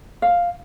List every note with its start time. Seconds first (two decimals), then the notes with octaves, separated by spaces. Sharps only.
0.22 F5